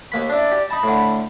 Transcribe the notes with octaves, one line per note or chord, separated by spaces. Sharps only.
D#2 A#3 B5
D4 E4 D5
G4
D#4 A5 B5
A2 D3